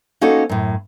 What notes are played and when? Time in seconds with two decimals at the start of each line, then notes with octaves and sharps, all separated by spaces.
0.21 A#3 C#4 D#4 F#4 A4 C5
0.49 F#2 A2